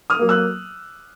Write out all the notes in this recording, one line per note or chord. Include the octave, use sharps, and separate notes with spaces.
D#6 F6
F#3 A#3
E6 F#6